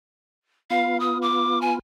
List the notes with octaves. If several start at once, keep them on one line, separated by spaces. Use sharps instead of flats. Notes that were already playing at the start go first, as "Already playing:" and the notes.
B3 F4 F5
D#6
D6
G#5